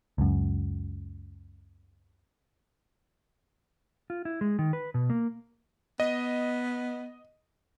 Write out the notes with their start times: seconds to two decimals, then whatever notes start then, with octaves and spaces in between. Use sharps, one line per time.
0.18 C#2 F#2
4.10 F4
4.25 E4
4.41 G#3
4.59 D#3
4.73 B4
4.94 B2
5.10 A#3
6.00 B3 D#5